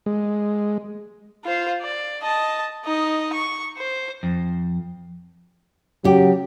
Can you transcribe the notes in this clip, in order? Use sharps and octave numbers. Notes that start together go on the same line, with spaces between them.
G#3
F4 C5
D5
D#5 A5
D#4 D#5
C#6
C5
F2
C#3 F#3 G4